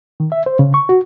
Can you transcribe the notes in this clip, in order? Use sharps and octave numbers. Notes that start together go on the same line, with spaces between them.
D#3
E5
C5
C#3
C#6
F#4